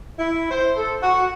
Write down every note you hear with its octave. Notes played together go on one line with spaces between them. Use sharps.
E4
C5
A4
F#4